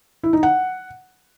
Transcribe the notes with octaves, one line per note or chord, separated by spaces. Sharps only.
E4
D#4
F#5